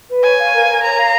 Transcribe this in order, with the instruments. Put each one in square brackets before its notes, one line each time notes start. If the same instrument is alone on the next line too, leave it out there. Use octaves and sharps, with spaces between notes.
[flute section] B4
[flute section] C#5 [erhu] G#5
[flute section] F5
A#4
A#4
[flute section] C#5 [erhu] A#5
[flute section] F5